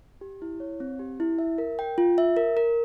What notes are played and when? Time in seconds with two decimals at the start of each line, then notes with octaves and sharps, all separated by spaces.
0.21 G4
0.42 E4
0.60 C#5
0.80 C4
0.99 G4
1.20 E4
1.39 E5
1.58 A#4
1.79 G5
1.98 F4
2.18 E5
2.37 A#4
2.57 A#4